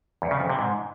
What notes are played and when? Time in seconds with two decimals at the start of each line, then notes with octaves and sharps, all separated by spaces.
0.22 E2
0.31 C#3
0.40 F2
0.49 C3
0.59 G#2